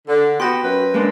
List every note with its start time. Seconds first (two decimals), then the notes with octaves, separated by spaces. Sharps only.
0.08 D3
0.40 B3 F#4 G4 C6 G6 A#6
0.63 F#2 B4
0.94 G#3 A#3 D4